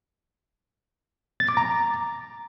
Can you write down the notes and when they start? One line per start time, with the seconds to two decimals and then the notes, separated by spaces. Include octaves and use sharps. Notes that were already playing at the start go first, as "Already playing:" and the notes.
1.40 A6
1.49 D6
1.57 A#5